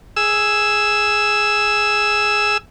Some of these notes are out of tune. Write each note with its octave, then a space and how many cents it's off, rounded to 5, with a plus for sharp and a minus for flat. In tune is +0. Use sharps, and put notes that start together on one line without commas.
G#4 +0 E6 +0